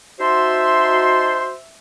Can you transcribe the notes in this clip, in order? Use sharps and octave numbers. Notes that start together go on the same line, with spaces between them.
D#4 F#4 C5 E5 A5 C6